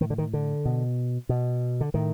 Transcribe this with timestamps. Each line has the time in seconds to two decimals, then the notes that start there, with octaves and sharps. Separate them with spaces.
0.01 A2 D#3
0.10 D3
0.18 D#3
0.33 D3
0.65 B2
1.29 B2
1.81 D3
1.94 A2 D#3